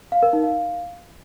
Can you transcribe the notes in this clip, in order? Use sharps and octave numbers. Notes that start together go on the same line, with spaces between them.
F5
A#4
D#4
F5